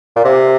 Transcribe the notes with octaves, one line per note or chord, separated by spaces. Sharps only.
A#2
C3